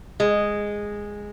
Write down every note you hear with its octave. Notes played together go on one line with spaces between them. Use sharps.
G#3